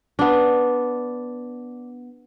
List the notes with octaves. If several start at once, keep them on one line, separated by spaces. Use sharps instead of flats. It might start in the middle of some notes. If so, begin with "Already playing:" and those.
B3 D4